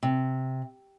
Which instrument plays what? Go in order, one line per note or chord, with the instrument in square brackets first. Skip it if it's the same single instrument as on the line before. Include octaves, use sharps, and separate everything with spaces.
[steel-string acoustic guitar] C3